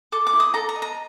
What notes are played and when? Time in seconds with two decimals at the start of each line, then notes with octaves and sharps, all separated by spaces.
0.12 A4 D6
0.27 D6
0.33 E4
0.40 D#6
0.54 A4 A#5
0.69 A#5
0.76 D#5
0.82 A#5